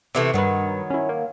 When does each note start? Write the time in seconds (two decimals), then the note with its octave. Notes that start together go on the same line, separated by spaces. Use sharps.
0.15 C3 E3 A3
0.34 G2 D#3 F#3 B4
0.90 C#4 E4
1.09 A#3